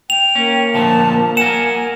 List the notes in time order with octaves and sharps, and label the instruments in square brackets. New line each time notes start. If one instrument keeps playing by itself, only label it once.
[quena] G5 [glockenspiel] F7
[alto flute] A#3 [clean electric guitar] C#4
[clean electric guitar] D2 A#2 F3 [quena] A5
[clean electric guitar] A#4 F#5 [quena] G#5 [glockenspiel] E7